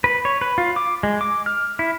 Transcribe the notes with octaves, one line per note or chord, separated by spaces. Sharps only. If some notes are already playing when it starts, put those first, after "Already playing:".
B4
C#5
B4
F4
D6
G#3
D6
F6
E4